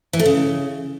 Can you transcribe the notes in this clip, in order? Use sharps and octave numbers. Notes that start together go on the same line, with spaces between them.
E3
A3
C#3